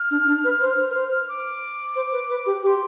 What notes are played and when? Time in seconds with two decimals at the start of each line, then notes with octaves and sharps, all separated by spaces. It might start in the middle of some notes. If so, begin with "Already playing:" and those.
Already playing: F6
0.11 D4
0.27 D4
0.44 B4
0.61 C5
0.91 B4
0.94 C5
1.29 D6
1.96 C5
2.12 B4
2.30 B4
2.46 G4
2.63 G4 D6
2.67 C6